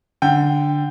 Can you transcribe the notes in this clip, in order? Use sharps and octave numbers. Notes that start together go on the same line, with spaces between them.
D3 G5